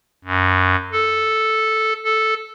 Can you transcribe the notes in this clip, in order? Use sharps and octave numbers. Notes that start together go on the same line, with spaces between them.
F#2
A4
A4